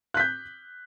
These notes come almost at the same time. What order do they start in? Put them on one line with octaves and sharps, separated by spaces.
F#6 B6 G6